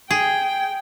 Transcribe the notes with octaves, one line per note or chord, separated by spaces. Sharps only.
G#4 G5